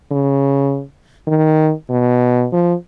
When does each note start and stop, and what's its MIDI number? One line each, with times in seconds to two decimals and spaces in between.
0.12 0.83 49
1.27 1.71 51
1.90 2.47 47
2.52 2.74 53